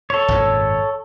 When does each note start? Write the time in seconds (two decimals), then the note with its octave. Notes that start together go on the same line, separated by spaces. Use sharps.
0.10 A4 C#5
0.28 G#1 F#2 A#2